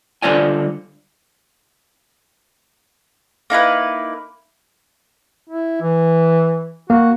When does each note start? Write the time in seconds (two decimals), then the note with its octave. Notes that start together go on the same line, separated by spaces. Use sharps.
0.22 D3 G3 F4 C5 D5 G#5
3.50 A#3 D#4 E4 B4
5.49 E4
5.81 E3
6.90 A#3 F#4